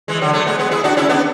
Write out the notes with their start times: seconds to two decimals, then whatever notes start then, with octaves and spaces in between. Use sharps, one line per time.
0.08 E3 G#3
0.21 D3 F#3
0.33 F#3 A3
0.46 G#3 B3
0.59 G#3 B3
0.71 E4 G#4
0.84 D4 F#4
0.97 C#4 E4
1.09 B3 D4